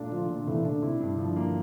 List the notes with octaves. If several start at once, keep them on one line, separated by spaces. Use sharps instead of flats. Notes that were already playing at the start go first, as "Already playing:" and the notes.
Already playing: A#2 A3 D4 F4
D3 F3 F4
A#2 D3
C3 E3 A3
D3 D4
C3 E4
G2
D3 F3
A#3